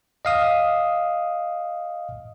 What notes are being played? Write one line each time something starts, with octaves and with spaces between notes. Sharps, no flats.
D#5 F5 D#6